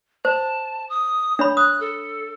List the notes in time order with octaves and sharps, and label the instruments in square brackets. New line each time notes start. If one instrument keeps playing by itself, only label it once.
[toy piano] C5 [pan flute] A5
[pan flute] D#6
[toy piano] D4 C#5 B5
[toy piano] D#6 [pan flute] F#6
[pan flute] A4